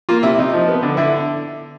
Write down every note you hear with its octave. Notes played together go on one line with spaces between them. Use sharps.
A#3 F4
C3 E4
C3 D#4
F3
B3
D3
D3 E4